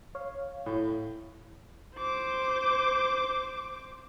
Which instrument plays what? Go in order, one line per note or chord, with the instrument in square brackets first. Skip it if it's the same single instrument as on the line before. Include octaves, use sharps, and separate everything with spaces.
[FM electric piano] C#5 F5
[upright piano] A2
[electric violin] C5 D6